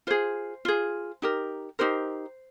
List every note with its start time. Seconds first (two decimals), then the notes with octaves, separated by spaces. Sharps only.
0.07 F4 G#4 C5
0.65 F4 G#4
1.22 D#4 G4 A#4
1.79 D#4 G4 A#4 C5